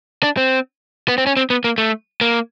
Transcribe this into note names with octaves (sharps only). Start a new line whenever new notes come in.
D4
C4
B3
C4
C#4
C4
B3
A#3
A3
A#3